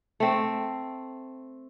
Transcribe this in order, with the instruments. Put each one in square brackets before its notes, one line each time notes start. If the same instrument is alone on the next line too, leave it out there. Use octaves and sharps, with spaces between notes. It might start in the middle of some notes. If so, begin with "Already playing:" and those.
[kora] A3 C4